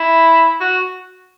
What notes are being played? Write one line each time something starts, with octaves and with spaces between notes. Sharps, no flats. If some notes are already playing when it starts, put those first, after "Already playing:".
Already playing: E4
F#4